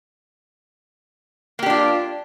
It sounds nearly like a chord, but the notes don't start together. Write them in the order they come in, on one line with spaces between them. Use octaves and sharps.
A#3 G4 D4 F4